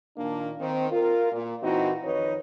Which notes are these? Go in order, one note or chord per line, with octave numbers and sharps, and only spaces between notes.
A#2 D#3 A#3 D4
D#3 C4
F4 A#4
A#2
A#2 E3 C4 D#4 E4 F#4
F2 D#3 D#4 B4 C#5